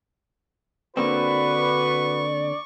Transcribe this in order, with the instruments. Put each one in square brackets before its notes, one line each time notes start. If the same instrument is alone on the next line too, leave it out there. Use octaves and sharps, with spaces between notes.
[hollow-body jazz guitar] D3 A#3 C4 [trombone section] F#4 B4 [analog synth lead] D5 [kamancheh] C#6